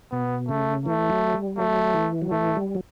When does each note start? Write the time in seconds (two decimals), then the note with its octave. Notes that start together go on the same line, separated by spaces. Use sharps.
0.11 B2 B3
0.48 C#3 A3
0.86 E3 A3
1.09 F#3
1.34 G3
1.58 F#3 A3
1.94 E3
2.22 F#3
2.31 E3 A3
2.56 G3
2.75 F#3